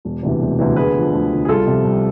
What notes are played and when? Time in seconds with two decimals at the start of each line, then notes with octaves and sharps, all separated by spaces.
0.05 E1
0.23 D2 C3 E3
0.41 E1
0.59 D2 C3 E3
0.76 D2 G#4 B4
0.95 D3 F3
1.13 D2
1.31 D3 F3
1.45 G#4
1.48 C2 F4 A4
1.66 C3 F3
1.84 C2